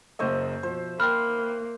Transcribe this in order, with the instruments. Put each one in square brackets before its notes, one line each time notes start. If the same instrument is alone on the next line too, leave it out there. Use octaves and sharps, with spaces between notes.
[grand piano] F#1 A#3 D#5 [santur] C5 C#5 E5
[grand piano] B2 F3 [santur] C5
[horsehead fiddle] A#3 [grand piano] G5 C6 F#6 [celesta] B5 F6